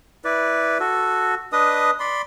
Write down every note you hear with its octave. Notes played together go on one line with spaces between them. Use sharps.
E4 B4 D5
F#4 A4
D4 B4 D#5 D#6
D5 B5 C6